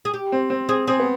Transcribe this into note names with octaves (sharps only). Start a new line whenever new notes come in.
G#4
G4
C4
C4
C4 G#4
C4 G#4
B3